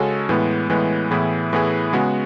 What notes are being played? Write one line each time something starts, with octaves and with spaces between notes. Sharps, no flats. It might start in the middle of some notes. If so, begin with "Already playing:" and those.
Already playing: C#3 G#3 C#4 F#4 A4
A2 E3 G#3 B3
A2 E3 G#3 B3
A2 E3 B3 E4 G#4
A2 E3 B3 E4 G#4
C#3 G#3 B3 F#4